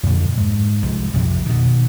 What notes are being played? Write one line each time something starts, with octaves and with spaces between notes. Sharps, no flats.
F2 A#2 D3 F#3
G#2
C2 G#2 F3
A#1 F2 C3
B2 D#3